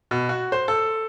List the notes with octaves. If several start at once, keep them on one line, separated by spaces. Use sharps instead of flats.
B2
F#4
C5
A4